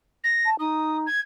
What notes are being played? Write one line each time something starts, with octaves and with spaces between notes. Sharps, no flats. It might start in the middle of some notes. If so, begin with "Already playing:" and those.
A#6
A5
D#4 D#6
G#6